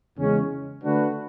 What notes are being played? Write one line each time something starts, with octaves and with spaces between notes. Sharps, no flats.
E2 C#3 G#3 C#4
D3 A3 D4 F#4 B4